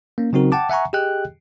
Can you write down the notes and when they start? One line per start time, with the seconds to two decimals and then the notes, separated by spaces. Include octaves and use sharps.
0.18 A#3 C#4
0.33 C#3 F#3 C4 D#4 F#4 A#4
0.52 F#5 G5 A5 D6
0.70 E5 F#5 G#5 A#5 C#6
0.93 G4 G#4 D#5 G5 F#6